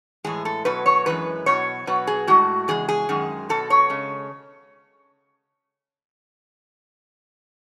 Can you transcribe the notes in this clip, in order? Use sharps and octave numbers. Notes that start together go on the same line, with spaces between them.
A2 E3 G#3 G#4
A4
B2 F#3 B4
C#5
F#2 E3 G#3 B4
B2 F#3 C#5
B2 F#3 B4
G#4
A2 G#3 F#4
E2 C#3 G#3 G#4
G#4
F#2 D#3 G#3
B2 F#3 A4
C#5
C#3 G#3